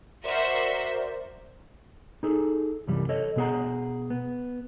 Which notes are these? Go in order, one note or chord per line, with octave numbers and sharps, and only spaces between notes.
F#4 A#4 C5 D5 E5 C6
D#4 G#4 A4
C2 F#2 E3 G3
A4 C#5 D#5
B2 B3 G#4 F#5 A#5
B3